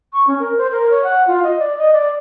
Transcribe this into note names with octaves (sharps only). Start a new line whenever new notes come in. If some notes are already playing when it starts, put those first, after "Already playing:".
C#6
C#4
A#4
C5
A#4
C#5
F#5
F4
D#5
D5
D#5
D5